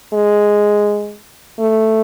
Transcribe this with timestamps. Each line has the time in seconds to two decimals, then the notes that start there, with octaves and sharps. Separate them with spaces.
0.13 G#3
1.60 A3